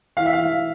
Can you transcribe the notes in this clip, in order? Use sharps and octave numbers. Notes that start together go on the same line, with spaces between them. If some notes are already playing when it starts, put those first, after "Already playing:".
E3 F5
E5
F5
E3